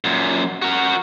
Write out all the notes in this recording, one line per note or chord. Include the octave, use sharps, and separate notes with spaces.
F#2 A#2
F#4 A#4